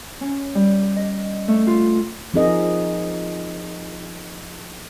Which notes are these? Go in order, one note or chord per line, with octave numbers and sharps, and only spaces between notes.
C#4
G3
D#5
A3
F4
F3 C4 D#4 G#4 A#4 D#5